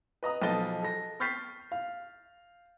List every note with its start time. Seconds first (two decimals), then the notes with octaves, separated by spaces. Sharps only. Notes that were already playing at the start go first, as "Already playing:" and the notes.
0.23 B4 D#5 A#5 D#6
0.42 B1 F3 A4 D#5 A6 G7
0.82 A4 A#6
1.20 C#6 F6 G6 A6 B6 C7
1.72 F5